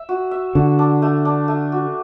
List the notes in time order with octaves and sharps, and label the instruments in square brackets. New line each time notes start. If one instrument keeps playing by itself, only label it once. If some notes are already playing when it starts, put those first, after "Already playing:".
Already playing: [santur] E5
F#4
E5
[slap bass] D3 [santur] F#4
[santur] D4
A3
D4
A3
F#4